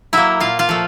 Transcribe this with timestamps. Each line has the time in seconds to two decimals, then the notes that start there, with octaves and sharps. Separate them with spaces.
0.13 F#3 A#3 E4 E5
0.40 A#2 F4 F5
0.59 F4 F5
0.69 F3 A3